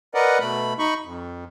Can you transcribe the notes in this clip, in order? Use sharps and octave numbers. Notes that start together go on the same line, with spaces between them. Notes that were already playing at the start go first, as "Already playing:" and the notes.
A#4 B4 D5 D#5 F#5
B2 A3 B5
D#4 B5 C#6
F2